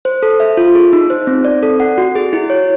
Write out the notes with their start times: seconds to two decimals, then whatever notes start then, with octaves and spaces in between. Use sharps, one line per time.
0.05 C5
0.23 A4
0.40 E5
0.57 F4
0.75 G#4
0.93 D#4
1.10 C5
1.27 C4
1.45 D5
1.63 A4
1.80 F#5
1.98 F#4
2.15 G#4
2.33 E4
2.50 C#5